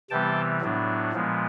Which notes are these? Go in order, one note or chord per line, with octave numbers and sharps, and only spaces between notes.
C3 E3 G3 B3 G5 A5
A2 F#3 B3 D4
A#2 F3 G#3 B3